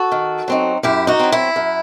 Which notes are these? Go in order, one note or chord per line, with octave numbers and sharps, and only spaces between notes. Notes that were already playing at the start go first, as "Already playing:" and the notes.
Already playing: F#4 A4
D#3
F#3 C4 D#4
F#2 E4 G4
D#4 F#4
F#3 C4
E4
F#2